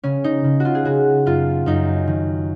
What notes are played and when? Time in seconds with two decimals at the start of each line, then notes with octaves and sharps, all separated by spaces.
0.04 C#3 C#4
0.24 D#4
0.44 C#3
0.60 F4 F#4
0.75 G#4
0.85 C#3 F#4
1.26 F#2 F4
1.66 F#2 D#4
2.07 D#3